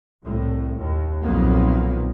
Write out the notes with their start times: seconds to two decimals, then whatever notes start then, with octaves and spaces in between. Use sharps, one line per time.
0.24 C2 A2
0.78 D#2
1.23 B1 F2 A#2 D#3 A#3 B3